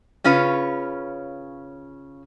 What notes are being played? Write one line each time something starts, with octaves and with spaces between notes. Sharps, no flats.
C#3 C#4 F4 B4 C#5